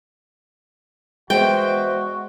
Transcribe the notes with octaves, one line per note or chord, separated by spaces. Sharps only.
E2 G#3 B3 F#4 C5 G5